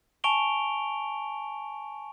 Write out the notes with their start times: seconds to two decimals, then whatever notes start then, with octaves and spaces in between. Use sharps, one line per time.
0.24 G#5 A5 C#6 D7 F7 G7